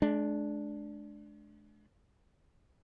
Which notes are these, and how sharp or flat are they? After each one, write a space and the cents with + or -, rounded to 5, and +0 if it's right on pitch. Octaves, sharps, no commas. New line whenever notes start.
G#3 +40 D4 +0